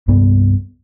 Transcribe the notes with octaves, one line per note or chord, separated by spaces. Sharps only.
C2 G2 A#3 B3